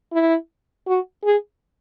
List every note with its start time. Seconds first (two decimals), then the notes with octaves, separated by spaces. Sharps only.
0.13 E4
0.87 F#4
1.24 G#4